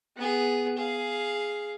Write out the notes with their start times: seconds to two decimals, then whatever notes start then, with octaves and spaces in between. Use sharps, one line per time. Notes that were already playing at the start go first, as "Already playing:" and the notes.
0.17 B3 G#4
0.77 G#4 F5